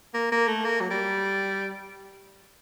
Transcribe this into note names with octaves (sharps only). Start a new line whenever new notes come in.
A#3
A#3
A3
A#3
F#3
G3